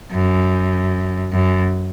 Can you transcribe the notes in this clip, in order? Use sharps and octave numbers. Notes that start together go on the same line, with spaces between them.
F#2
F#2